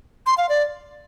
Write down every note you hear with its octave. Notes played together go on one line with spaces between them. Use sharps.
C6
F5
D5